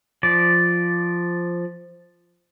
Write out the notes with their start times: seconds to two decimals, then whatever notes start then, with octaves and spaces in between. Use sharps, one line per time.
0.23 F3 D5